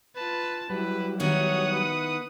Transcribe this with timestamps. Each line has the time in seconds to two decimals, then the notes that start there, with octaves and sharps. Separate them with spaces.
0.16 F4 B4 A5
0.70 F#3 G3 E4 B4
1.20 D#3 B3 E4 C#5 F#5 D#6
1.72 B4